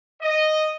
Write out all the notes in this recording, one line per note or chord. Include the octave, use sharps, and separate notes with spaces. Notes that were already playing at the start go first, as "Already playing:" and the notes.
D#5